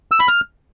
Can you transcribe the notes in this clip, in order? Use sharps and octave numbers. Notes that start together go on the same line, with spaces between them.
E6
B5
F6